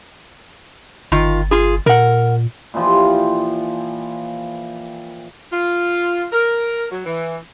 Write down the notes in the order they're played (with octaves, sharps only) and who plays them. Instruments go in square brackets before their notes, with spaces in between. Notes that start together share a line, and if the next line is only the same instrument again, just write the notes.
[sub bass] G1 [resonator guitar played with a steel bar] D#3 F4
[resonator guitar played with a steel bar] F4 G#4
[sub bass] A#2 [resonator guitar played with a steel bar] A#4 F#5
[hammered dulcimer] A#2 E3 F3 G4
[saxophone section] F4
A#4
F#3
E3